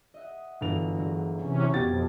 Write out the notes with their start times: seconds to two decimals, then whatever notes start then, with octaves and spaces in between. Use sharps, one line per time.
0.14 D#5 E5 F#5
0.61 G1 E3 F#4 F7
0.96 G#2 D3 F#3
1.41 C3 E3 C#4
1.74 F2 B2 F4 G4 G#6 A6